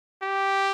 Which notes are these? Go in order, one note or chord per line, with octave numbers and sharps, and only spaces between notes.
G4